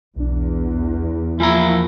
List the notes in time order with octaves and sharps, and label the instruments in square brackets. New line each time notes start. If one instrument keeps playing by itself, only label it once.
[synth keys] B1 D4 [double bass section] E2
[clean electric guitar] F3 A#3 A#5 [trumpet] E4 [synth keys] G#5